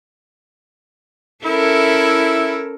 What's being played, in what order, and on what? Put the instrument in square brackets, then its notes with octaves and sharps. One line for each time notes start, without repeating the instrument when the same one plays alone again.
[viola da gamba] C#4 A4 A#4 [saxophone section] E4